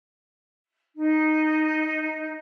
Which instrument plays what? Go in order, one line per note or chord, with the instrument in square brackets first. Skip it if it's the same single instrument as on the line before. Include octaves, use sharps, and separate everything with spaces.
[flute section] D#4